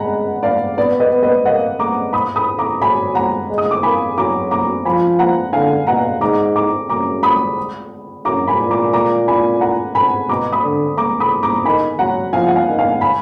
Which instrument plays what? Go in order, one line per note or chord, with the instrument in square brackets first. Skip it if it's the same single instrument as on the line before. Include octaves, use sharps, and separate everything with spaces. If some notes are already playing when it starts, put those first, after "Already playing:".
Already playing: [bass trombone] G#3 [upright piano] F#5 G#5 A#5 B5
[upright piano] D5 F5
[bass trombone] B3 [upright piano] D5
[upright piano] B4 D#5
[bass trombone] B3
[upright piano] B4 D#5
[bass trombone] A#3 [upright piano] D#5 F#5
[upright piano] A#5 D6
B5 D#6
B5 D#6
A#5 D6
[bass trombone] F#3 [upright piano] G#5 B5
[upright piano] F#5 A#5
[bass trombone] G#3
[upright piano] D#6
D6
[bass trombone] A#3 [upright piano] G#5 B5
[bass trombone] F#3 [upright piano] A#5 D6
[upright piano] A#5 D6
[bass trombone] F3 [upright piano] G#5 B5
[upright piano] F#5 A#5
[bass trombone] D3 [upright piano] F5 G#5
[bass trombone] B2 [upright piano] F#5 A#5
[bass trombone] G#2 [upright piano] A#5 D6
[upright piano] A#5 D6
[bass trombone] F#2 [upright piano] A#5 D6
[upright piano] B5 D#6
[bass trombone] F#2 [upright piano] A#5 D6
[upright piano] G#5 B5
[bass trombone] A#2
[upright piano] A#5 D6
A#5 D6
G#5 B5
F#5 A#5
G#5 B5
[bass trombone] B2 [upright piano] A#5 D6
[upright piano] B5 D#6
[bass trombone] D3
[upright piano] A#5 D6
B5 D#6
A#5 D6
[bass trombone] D#3 [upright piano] G#5 B5
[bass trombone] F#3 [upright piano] F#5 A#5
[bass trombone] F3 [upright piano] F5 G#5
[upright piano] F#5
F5 G#5
[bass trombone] D#3
[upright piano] F5 G#5
G#5 B5